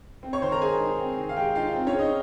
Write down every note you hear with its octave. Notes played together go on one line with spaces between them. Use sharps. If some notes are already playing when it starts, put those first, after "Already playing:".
C4
C#5 C#6
D#3 C5 C6
A#4 A#5
G#3 G#4 G#5
D#4
C4
D#3
F5
G#3 G4 G5
D#4 F4 F5
C4
C#4 C#5
C#3
D#4 D#5